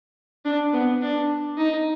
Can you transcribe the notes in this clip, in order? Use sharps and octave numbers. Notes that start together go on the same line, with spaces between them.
D4
B3
D4
D#4